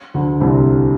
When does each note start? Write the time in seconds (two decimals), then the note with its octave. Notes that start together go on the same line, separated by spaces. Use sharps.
0.14 D2 D3
0.40 C2 C3